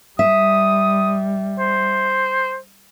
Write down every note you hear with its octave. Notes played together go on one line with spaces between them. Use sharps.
G3 E5 D#6
C5